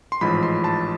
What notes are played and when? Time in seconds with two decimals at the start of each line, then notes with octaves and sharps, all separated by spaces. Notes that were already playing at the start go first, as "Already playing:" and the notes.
0.12 C6
0.21 A1 G#2 F3 B5
0.43 C6
0.64 A5